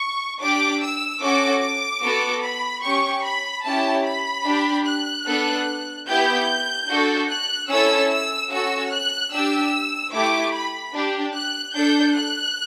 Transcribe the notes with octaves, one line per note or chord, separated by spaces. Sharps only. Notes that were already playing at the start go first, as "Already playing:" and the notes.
Already playing: C#6
D4 G4 D6
E6
C#4 F#4 A4 D6
D6
B3 F#4 A4
B5
C#4 G4 C#6
B5
C#4 E4 G4 A5
B5
D4 G4
F#6
B3 D4 A4
B3 E4 G4 G6
D4 F#4 A4
F#6
C#4 E4 A4 E6
E6
C#4 F#4 A4 E6
F#6
D4 G4 E6
A3 E4 G4 D6
B5
D4 G4
F#6
D4 A4 G6
F#6